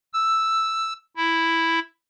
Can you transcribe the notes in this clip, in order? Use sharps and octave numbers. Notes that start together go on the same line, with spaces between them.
E6
E4